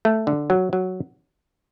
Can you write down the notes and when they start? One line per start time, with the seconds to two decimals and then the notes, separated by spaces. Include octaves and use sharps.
0.05 A3
0.27 D3
0.50 F#3
0.73 F#3